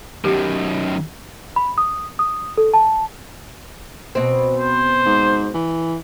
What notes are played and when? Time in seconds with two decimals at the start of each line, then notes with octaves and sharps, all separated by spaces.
0.25 F#2 D#3 G4
1.56 B5
1.78 D#6
2.19 D#6
2.57 A4
2.74 A5
4.15 B2 C4
4.59 C5
5.05 G#2
5.54 E3